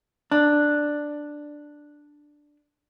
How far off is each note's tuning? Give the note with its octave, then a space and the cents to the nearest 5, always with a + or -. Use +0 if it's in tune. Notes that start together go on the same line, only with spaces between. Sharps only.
D4 +5